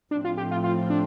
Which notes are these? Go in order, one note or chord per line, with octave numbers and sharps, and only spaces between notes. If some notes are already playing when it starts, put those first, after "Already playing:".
A2 F3 A3 C4 D4
F4
G4
F4
F4
D4